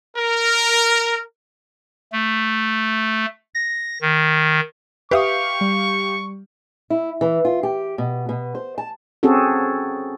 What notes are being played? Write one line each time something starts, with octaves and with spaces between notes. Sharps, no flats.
A#4
A3
A#6
D#3
G4 B4 E5 F5 C#6 D#6
G3
E4
E3
F4
G4
B2
B2
C5
A5
C4 C#4 F#4 G#4 A4